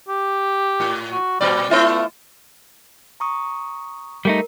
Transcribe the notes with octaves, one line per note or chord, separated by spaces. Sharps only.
G4
A2
F#4
A#2 G3 C4 D5
A3 B3 E4 F4
A#5 C#6 D#6
G3 A3 D#4 A#4